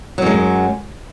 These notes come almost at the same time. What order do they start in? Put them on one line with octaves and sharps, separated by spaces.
F#3 F#2 G#3